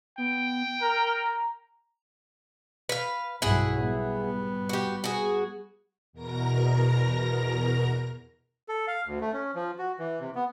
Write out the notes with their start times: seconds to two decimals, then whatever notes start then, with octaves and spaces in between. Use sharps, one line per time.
0.18 B3 G5
0.81 A#4 A#5
2.89 B4 F5
3.42 B1 G2 E4 G#4 F#5
3.83 G3 B3
4.69 F#4 G4
5.04 F#4 G#4
6.13 E2 B2 A#4 A#5 A#6
8.69 A4
8.88 F5
9.06 D2
9.21 A3
9.33 C#4
9.55 F3
9.79 F#4
9.99 E3
10.20 C3
10.35 B3